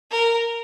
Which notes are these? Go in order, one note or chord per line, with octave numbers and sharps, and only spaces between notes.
A#4